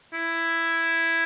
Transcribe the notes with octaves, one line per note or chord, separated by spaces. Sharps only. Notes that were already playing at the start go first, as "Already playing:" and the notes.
E4